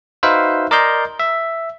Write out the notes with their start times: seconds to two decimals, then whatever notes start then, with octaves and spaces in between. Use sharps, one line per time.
0.23 D#4 F#4 B4 C5 E5 F5
0.71 A#4 D5 D#5 A#5 C6 G6
1.19 E5